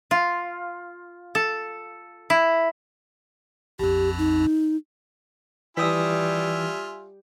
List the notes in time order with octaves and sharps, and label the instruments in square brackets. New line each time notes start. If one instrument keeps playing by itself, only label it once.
[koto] F4
A4
E4
[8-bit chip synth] A#1 F2 [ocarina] G4
[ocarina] D#4
[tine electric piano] E3 [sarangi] G3 [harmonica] F4 E5 G#5 [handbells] D#6 E6 B6